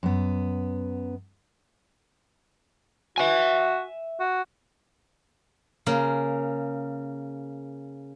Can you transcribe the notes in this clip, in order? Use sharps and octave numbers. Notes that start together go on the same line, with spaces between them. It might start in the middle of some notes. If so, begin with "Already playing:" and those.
F#2 B3
F#4 E5 G#5
F#4
C#3 A#3